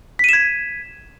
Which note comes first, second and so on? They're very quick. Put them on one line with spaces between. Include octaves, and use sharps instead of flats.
B6 D#7 E7 G#6